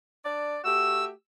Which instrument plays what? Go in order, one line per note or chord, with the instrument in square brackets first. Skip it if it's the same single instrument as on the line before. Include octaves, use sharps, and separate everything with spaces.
[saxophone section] D4 D5
[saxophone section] A3 F#4 G4 [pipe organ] E6